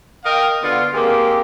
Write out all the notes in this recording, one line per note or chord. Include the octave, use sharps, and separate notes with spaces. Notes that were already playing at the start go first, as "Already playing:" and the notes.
A#4 D#5 F5 G5
D3 B3 F4
G#3 A#3 C4 G4